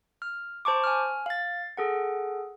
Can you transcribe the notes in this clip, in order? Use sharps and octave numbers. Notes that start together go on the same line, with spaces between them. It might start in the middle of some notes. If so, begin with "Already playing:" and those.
F6
C5 A5 C#6 D6
G#5 F6
F5 A6
G#4 A4 F#5